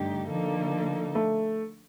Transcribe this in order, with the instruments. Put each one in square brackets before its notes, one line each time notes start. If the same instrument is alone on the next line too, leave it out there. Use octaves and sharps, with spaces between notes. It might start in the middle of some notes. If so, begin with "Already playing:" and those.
Already playing: [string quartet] G2 D3 A3 D#4 G4
D3 F3 A#3 D#4 A4
[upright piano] A3